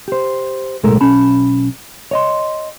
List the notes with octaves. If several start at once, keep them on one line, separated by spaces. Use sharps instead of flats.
G4 C5
B1 A2 G#3 A4 A#4
B1 C#4 A5 B5
C#5 D#5 C6